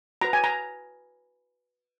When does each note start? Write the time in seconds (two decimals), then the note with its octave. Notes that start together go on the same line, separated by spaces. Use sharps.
0.21 F#4 B4 A#5
0.33 G#5
0.44 A#5